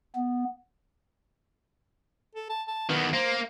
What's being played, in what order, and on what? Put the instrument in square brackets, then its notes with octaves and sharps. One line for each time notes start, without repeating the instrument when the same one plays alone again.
[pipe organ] B3
[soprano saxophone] A4
A5
A5
[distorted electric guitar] E2 D#3 [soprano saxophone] B3
[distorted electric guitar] A#3 [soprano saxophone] C5